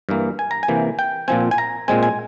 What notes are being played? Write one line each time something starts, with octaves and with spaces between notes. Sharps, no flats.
G2 E3 A#3
G#5
A#5
G#5
C3 E3 A#3
G5
A#2 F3 C4 G#5
G#5
A#5
A#2 G#3 C4 G#5
G#5